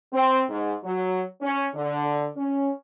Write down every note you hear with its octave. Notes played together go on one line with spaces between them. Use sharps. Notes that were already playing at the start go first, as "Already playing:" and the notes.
C4
G#2
F#3
C#4
D3
C#4